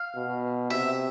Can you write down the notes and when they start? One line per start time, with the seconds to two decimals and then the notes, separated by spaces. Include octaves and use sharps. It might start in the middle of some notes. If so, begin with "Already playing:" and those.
Already playing: F5
0.16 B2
0.70 C3 E5